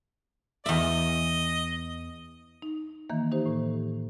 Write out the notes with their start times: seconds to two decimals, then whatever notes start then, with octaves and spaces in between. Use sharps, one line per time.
0.66 E2 D#5 E5
2.62 D#4
3.10 D#3 E3 A#3
3.32 D#4 G4 C5
3.46 A2